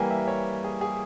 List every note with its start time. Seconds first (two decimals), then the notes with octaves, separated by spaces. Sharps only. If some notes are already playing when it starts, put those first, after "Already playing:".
Already playing: E3 G3 A#3 G5 G#5
0.10 E5
0.27 C#5
0.64 G#4
0.81 G#4